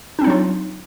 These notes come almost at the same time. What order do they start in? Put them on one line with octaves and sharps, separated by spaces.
D4 C4 D#4 F#3 F4